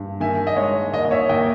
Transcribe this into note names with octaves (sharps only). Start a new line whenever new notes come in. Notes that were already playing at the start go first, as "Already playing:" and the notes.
Already playing: G2
D#3 E5 G#5
D#5
G#3 C#5
D#2 D#5
D#5
C#5 E5
D#2 D#5 G5